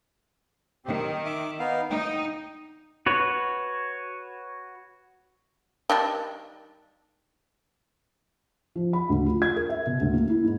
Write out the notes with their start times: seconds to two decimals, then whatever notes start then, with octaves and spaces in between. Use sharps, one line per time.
0.85 D#3 C4 G4
1.25 E5 D6
1.59 B3 D#4 F5
1.90 D#4 G5
3.06 F#4 B4 C#5
5.90 D#3 G3 D4
8.76 F3
8.93 B5
9.10 D2
9.26 F4
9.42 G#6
9.56 A#4
9.69 E5
9.87 B2
10.01 D2
10.14 A#3
10.29 E4
10.44 G#2